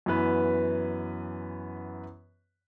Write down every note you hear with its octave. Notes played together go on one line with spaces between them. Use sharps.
F#2 E3 B3 B4